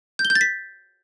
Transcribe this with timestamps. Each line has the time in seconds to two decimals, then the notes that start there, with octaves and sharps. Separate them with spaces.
0.19 G6
0.25 G7
0.30 G6
0.35 A6
0.41 B6